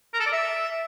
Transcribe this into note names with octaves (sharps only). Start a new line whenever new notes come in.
A#4
A4
D5
E5